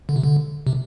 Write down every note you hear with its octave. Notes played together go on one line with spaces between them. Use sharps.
D3
C3
D3
C3